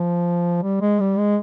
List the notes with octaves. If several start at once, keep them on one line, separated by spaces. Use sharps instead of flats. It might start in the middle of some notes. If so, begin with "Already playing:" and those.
Already playing: F3
G3
G#3
G3
G#3